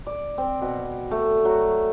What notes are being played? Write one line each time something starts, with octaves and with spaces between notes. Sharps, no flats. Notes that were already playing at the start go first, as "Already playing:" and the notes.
D5
C4
B2
A3
F#3